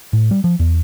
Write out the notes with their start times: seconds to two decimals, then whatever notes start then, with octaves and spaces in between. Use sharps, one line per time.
0.13 A2
0.31 G3
0.44 F3
0.60 E2